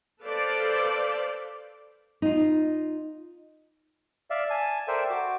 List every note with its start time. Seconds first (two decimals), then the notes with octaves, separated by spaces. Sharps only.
0.24 A4 B4 C5 D5 F5
2.22 D#4 F4
4.30 D5 E5 F5
4.50 G#5 A5
4.88 A4 A#4 C5 D5 E5 G5
5.10 F#4 D6